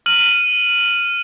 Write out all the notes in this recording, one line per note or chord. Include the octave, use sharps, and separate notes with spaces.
F6 D#7 F#7